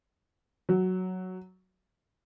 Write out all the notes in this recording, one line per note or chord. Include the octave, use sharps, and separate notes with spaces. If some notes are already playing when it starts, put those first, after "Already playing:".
F#3